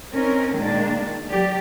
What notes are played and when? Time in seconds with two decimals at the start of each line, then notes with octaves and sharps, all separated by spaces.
0.13 C4 C#4 D#4 A#4
0.55 A#2 D#3 G#3 A#3 D4
1.29 F#3 G4 D5